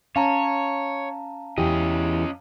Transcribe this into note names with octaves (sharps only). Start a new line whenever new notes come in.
C#4 C#5 F5 A5 A#5
E2 E3 C#4 G4 D#5